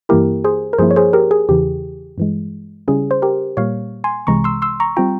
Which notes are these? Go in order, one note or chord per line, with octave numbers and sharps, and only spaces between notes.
G2 E3 A#3 E4 G4 A#4
G#4 C5
A#4
G2 F3 A#3 E4 G#4 C5
C#5
G#4 C5
G4 A#4
G#4
E2 C#3 E3 G4
G2 E3 G#3
C#3 G3 C#4 E4 G#4
C5
G4 A#4
A#2 G3 A#3 C#5 F5
G#5 C6
C2 C3 E3 G#3 A#5 C#6
C6 E6
C6 E6
A#5 C#6
G3 C4 F4 G5 A#5